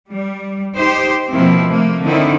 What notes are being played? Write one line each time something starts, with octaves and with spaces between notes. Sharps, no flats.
G3
D#4 G4 C5
B2 D#3 F3 A#3 C4 E4
C3 A3 A#3
D3 D#3 C4 D#4 E4